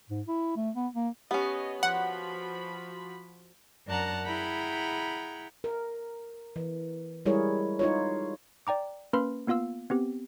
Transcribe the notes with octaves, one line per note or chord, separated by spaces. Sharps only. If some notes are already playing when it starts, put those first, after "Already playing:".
G#2
E4
A3
B3
A#3
B3 C#4 G4 C#5 D#5
F3 F#4 F#5 B5
F#2 D4 A#4 F#5 A5 A#5
E4 G#4 F#5 G5 A#5 B5
A#4
E3
G3 G#3 E4 G#4 A#4 C#5
D#4 F4 C#5
D5 G5 A#5 D6
A#3 C#4 B4 B5 C6 F6
A#3 B3 F4 F5 E6
B3 C4 G4